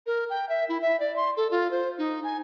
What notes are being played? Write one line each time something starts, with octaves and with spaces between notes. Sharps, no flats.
A#4
G5
E5
E4
E5
D5
C6
A4
F4
C5
D#4
G#5